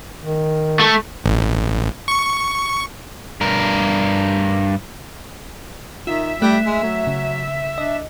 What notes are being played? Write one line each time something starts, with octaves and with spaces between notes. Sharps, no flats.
D#3
A3
A1
C#6
G2 A#4
D#3 F4 E5
G3 A3 F#6 B6
G#3
F#3 A3
C#3
D4 D#5